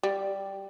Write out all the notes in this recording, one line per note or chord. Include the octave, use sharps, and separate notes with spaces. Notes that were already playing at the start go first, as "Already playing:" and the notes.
G3